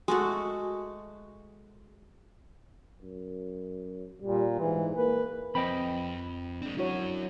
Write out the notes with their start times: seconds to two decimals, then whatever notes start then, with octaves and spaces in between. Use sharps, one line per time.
0.08 G#3 A3 F#4
3.02 F#2
4.22 A#2 G3
4.59 G#2 E3
4.96 A#3 B4
5.55 F2 C4 D#5 G5 B5
6.62 G#3 C4 D4
6.77 F#3 C#4 E4 F#4 C#5